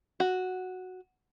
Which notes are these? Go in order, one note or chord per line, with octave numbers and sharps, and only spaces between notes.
F#4